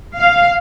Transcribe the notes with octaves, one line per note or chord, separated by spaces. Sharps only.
F5